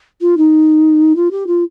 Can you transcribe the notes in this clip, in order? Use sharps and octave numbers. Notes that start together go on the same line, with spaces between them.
F4
D#4
F4
G4
F4